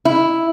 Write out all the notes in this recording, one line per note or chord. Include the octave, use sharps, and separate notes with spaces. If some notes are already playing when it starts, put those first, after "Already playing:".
E4